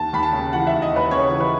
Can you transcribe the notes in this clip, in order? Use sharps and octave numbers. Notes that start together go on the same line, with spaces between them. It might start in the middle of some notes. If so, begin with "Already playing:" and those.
Already playing: D#2 A5
D#2 B5
A5
C#3
E3 F#5
D#2 E5
D#5
D#2 B4
C#3 C#5
E3
B4